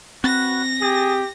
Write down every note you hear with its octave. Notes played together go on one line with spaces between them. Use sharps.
C4 F#4 B4 A#6
G4 G#4